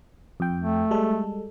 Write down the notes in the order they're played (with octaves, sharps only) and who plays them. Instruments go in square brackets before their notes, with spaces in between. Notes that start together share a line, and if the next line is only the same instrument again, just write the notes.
[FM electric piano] F2 G5
[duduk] A3
[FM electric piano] G3 G#3 A4